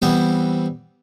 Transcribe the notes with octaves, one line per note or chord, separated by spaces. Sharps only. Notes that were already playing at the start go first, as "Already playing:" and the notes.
E3 G3 B3 C4 G5